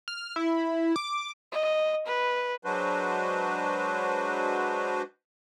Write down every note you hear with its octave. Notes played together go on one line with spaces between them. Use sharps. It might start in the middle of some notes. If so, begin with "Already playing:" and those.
F6
E4
D6
D#5
B4
F#3 G#3 D4 F#4 B4 C5